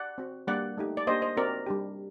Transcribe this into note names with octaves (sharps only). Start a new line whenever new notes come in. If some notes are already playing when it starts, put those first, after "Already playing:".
Already playing: D5 F#5
C4 F#4
G3 A#3 D4 D5 F#5
A3 D#4 G4
D5
A#3 D4 G4 C5 D#5
C5 D#5
C4 F#4 A#4 D5
G3 D4 G4